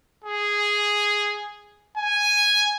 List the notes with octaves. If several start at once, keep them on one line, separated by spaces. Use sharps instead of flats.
G#4
G#5